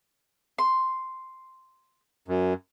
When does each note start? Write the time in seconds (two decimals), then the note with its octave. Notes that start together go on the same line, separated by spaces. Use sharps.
0.58 C6
2.28 F#2